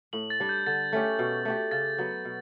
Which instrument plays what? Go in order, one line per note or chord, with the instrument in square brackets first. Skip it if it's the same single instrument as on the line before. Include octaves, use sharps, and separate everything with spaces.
[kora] A2 [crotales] F#7
[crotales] A6
[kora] G3 D4 G4
[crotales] G6
[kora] D3 [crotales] A6
[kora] A3 C#4 G4
B2
A3 D4 G4
[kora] C#3 [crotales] A6
[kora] F#3 B3
B2